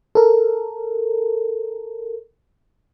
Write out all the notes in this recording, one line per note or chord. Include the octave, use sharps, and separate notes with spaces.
A4 A#4